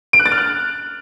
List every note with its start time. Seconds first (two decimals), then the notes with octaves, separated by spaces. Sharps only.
0.13 D7
0.19 F#6
0.26 A6
0.32 F6
0.38 F#6